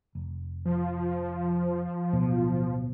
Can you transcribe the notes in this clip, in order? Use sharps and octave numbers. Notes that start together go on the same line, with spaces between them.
F1
F3
D1 B2